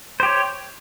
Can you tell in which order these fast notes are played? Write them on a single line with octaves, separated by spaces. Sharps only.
C5 G4 C#5